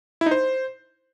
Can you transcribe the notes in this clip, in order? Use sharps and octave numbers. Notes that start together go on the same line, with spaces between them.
E4
D#4
C5